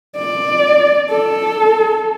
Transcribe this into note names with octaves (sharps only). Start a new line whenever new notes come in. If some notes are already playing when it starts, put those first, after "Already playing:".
D5
A4